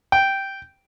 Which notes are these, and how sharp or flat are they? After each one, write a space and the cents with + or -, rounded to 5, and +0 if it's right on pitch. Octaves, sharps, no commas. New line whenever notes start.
G5 -5